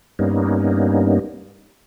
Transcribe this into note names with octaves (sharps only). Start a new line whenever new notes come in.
G2 G3 A#3 B3 C#4 D#4